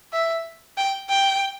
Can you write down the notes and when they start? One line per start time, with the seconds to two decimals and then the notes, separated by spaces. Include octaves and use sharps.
0.13 E5
0.78 G5
1.09 G5